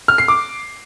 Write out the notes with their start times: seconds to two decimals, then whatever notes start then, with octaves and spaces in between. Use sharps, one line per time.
0.08 F6
0.18 C7
0.28 D6